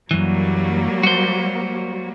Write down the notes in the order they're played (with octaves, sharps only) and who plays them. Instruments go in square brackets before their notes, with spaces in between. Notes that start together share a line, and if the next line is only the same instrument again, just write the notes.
[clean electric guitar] F#2 E3 [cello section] F#3 G3 A#3
[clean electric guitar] F#4 C5